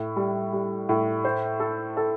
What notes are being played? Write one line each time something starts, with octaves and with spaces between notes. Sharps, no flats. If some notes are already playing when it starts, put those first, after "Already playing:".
Already playing: A2
G3
G3
A2
C5
A4
A4